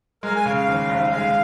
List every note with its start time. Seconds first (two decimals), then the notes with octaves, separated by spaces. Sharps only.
0.23 G#3 A#4
0.36 G#5
0.45 C#3 F5
0.57 F5
0.67 D#2
0.89 F1
1.11 G#3 F5